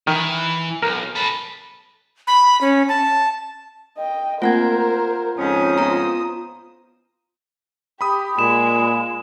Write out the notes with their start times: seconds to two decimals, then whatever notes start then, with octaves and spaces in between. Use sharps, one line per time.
0.07 D#3 E3
0.82 B1 A#4
1.15 A4 B4
2.27 B5
2.61 C#4
2.89 A5
3.98 D#5 G5
4.42 A3 A#3 C4 F4 A#4 C5 F#5 G#6
5.37 F2 G#2 C#4 C5 D#6
5.78 B3 F4 A#5
8.01 G4 B5 D#6
8.39 A#2 G#3 E7